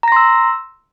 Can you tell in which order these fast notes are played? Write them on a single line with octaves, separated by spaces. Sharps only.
A#5 A#6 C6 E6